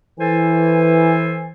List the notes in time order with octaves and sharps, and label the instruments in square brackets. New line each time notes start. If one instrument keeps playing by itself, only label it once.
[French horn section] E3 [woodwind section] A4 C5 G#5